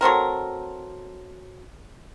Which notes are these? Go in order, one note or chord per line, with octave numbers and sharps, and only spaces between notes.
F#3 A3 C4 A#4